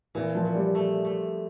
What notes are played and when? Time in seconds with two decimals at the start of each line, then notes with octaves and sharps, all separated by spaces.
0.15 A#2 E3
0.35 F3
0.45 A#2
0.55 G3
0.75 A3
1.05 A3